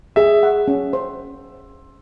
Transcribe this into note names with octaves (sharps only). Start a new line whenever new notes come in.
G#4 E5
F#5
C#4
C5